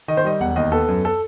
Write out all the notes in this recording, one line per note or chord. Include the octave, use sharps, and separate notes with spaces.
D#3 D#5
C5
G3 D#5
E1 F#5
D#2 D#5
B3 A4
F#2
A4